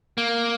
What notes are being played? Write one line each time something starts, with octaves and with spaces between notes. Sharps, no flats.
A#3